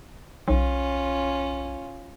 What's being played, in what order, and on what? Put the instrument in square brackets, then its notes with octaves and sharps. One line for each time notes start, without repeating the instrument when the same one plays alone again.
[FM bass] B1 [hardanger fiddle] C#4 F4